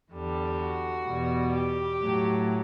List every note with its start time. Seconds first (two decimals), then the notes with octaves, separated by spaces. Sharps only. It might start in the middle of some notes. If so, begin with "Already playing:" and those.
0.12 E2 D3 G3
0.58 F#4
1.06 E2 B2 G3
1.53 G4
2.01 A2 F#3